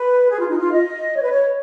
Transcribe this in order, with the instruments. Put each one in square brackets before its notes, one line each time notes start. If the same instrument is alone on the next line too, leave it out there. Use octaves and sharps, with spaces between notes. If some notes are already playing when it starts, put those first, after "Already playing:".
Already playing: [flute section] B4
G#4
F4
D#4
F4
D#5
C#5
B4
C#5